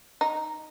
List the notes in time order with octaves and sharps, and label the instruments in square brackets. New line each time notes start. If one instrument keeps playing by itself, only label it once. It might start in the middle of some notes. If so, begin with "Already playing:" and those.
[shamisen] D#4